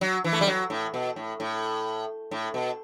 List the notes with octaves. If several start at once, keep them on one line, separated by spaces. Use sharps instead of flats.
F#3
E3
A3
G3
F#3
A2
B2
A2
A2
A2
B2